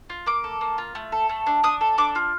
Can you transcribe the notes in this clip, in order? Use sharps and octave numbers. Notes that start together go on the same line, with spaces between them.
F4
A#3 D6
A4
A#3
F4
A3
A4
A3
D4
D4 D#6
A4
D4 D6
F4